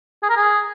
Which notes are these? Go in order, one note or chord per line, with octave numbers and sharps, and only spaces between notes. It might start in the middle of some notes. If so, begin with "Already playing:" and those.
G#4
A#4
G#4